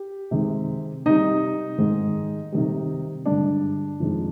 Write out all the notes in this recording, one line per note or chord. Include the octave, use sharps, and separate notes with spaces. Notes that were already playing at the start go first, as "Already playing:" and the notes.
Already playing: G4
C3 D#3 G#3
C3 G3 D#4 D#5
G#2 D#3 G#3
C3 D#3 G3
G2 D3 G#3 D4 D5
F2 C3 D#3 G#3